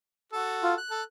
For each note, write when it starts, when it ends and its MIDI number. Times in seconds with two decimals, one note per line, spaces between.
0.32 0.76 66
0.32 0.76 69
0.63 0.74 65
0.78 1.04 90
0.91 1.02 69